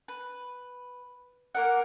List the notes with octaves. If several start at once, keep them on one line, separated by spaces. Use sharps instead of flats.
B4
A#3 A#4 F#5